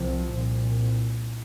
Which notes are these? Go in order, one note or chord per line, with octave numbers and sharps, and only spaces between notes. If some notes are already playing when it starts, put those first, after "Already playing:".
Already playing: C2 C3 F3
C2 A#2